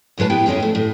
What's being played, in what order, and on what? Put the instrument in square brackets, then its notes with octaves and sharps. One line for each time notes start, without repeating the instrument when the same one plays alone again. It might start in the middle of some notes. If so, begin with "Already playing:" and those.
[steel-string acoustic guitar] D2 A2 G#3 B4 A5
B3 E4 G4 B4 G5
F2 D#3 G#3 C#4 D#4 E5
G#3 A3
A2